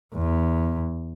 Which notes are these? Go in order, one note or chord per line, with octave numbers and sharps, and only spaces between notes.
E2